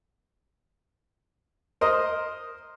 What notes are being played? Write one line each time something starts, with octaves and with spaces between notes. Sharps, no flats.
A#4 C5 D#5